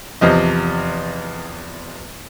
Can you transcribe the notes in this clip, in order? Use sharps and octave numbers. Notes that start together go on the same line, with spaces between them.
E2 C3 F3 D#5